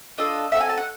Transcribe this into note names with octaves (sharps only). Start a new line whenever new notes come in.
D4 F4 A4 D#5
C4 D#4 F#4 A4 E5
G#5
A5
F#5